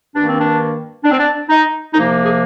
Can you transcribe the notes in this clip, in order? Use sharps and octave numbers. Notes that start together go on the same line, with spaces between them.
G2 D#3 A#3 D4
C4
D4
D4
C4
D4
D#4
C2 C3 F3 A#3 D#4
G#4